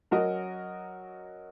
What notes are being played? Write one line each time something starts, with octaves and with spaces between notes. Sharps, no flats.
F#3 C#4 F#4 A#4 D#5